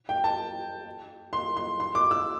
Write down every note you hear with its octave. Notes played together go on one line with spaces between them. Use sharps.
G5
A5
C6
C6
C6
D6
E6